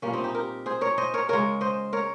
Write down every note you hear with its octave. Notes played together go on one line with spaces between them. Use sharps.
A#2 G3 A#3 C#4
C4 D#4
D#4 G4
G4 A#4
G#4 C5
A#4 C#5
C5 D#5
A#4 C#5
C#3 G#3 A#4 C#5
C5 D#5
A#4 C#5